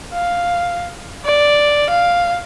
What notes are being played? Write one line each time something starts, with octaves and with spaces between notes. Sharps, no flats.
F5
D5
F5